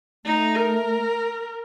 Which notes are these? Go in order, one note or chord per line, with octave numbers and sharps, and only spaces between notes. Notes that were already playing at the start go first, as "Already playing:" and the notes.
A3 D#4
A#4